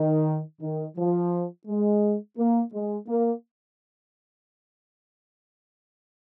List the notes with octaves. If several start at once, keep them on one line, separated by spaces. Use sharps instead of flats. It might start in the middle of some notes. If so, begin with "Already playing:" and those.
Already playing: D#3
D#3
F3
G#3
A#3
G#3
A#3